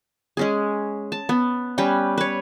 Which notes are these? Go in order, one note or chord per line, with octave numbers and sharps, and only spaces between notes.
G#3 C#4 G#4
A5
B3
G3 C#4 B4 G5
B4 C#5